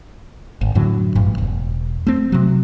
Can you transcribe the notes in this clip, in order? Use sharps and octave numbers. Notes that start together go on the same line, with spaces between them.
G#1
F#2 A2 D3 F#3
A1 G2
E1
A3 C4
C3 F#3